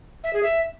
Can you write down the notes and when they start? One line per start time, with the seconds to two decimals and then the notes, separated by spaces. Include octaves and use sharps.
0.24 E5
0.33 G#4
0.43 E5